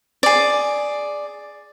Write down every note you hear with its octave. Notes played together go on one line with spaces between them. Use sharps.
G#4 D5